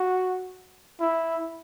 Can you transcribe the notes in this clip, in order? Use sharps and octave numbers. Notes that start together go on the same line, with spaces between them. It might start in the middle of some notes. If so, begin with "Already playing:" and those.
Already playing: F#4
E4